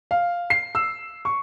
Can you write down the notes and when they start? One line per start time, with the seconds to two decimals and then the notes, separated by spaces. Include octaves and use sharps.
0.11 F5
0.50 C7
0.75 E6
1.25 C#6